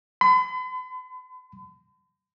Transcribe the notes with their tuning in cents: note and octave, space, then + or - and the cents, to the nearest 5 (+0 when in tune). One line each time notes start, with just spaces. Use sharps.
B5 +45